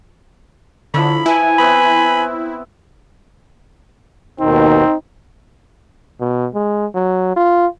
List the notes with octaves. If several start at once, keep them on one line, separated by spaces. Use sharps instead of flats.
D3 F3 E4 C#5 B5
E4 B4 G#5
B3 C4 B4 B5
D#2 B2 D#3 C4 D#4
B2
G#3
F#3
F4